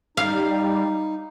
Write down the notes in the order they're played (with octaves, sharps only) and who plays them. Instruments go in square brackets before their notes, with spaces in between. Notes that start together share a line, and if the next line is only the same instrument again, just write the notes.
[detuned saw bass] G3 [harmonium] D#4 [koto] F5